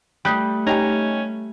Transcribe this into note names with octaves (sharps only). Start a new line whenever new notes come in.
G3 A3 D#6 F#6 G6
C#4 D#4 G4 G#5 A#5